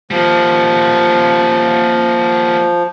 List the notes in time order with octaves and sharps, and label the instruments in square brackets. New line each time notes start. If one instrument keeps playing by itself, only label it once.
[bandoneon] F3 [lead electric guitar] G3 A#3